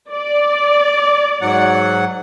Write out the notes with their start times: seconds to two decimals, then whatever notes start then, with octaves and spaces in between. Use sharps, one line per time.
0.10 D5
1.41 G#2 F#3 F#5